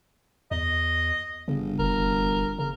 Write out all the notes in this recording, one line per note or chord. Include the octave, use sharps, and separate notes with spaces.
E2 D#5
G1 C#3
F1 A#4
C#3 A#4